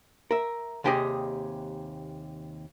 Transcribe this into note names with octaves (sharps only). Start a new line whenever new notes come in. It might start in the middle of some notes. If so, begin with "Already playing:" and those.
A#4 E5
D#2 C3 G4 G#4 D5 D#5